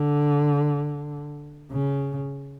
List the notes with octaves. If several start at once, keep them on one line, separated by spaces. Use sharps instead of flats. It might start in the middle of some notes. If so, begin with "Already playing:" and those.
Already playing: D3
C#3